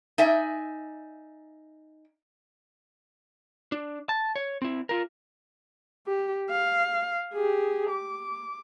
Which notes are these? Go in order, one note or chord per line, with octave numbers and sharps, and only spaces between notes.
D#4 D5 E5 G#5
D4
A5
C#5
C4 E4
F4 A#4
G4
F5
G4 G#4
D6